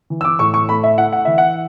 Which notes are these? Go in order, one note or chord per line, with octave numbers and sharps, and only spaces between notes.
E3
E6
D6
A2 C#6
C#6
A3 B5
E5
E4 F#5
F#5
E3 E5
F#5